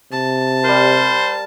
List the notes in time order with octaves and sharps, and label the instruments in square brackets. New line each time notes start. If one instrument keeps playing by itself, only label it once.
[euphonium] C3 [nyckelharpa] A5
[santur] G3 A#4 [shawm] C5